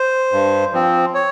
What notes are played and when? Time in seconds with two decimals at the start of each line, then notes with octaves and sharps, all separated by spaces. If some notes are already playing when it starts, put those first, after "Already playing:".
Already playing: C5
0.32 G2
0.73 F3 C4
1.14 C#5